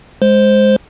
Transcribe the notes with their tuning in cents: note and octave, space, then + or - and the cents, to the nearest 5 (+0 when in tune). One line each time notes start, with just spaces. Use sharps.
G#3 +0 C5 +0